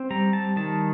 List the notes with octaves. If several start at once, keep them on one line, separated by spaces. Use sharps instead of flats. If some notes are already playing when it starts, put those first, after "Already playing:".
Already playing: C4
G3 A#5
A5
D#3 A5